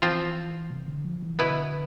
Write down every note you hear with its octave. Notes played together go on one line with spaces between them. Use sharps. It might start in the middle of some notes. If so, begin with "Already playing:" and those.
E3 F3 C4 F4 C5
C3
D3
F3
E3
B2 D3 B3 E4 B4